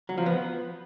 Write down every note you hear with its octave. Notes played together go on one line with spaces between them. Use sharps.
F#3
F3
B3